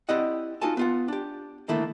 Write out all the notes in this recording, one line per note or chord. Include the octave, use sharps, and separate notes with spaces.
C4 E4 G4 D5 D#5 F#5
D#4 F4 F#4 A4 G#5 A5
B3 F4 F#5
D4 G4
D3 D#3 A3 A#3 E4